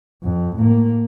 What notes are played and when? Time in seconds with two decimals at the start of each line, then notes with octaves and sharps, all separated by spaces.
0.23 F2
0.56 A2 A#3